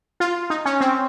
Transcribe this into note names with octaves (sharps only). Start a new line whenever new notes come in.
F4
D#4
C#4
C4